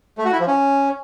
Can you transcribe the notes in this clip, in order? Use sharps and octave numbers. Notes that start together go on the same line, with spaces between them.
A3
F#4
E4
F3
C#4